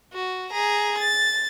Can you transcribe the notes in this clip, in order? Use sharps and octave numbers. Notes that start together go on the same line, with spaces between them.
F#4
G#4 A#5
A6